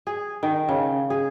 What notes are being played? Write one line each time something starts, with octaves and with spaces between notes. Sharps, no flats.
G#4
D#3
C#3
G#4